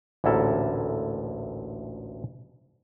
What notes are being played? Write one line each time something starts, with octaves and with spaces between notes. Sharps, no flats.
A1 D2 A#2 E4 A4 A#4